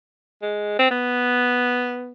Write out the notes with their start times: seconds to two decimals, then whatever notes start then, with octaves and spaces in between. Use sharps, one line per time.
0.42 G#3
0.79 C4
0.91 B3